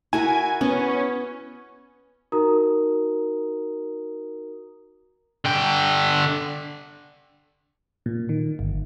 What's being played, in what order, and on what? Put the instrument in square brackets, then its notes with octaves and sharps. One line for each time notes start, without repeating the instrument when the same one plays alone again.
[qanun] E4 F#4 A#4 [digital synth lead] G#5
[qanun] B3 [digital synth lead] C#4
[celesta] D#4 F#4 A#4 A#5 D#6
[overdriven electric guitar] D3 G5
[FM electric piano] A#2
D#3
G1